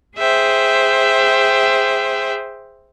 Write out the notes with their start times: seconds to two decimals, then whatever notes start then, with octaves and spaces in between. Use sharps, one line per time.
0.18 G#4 C5 E5 G5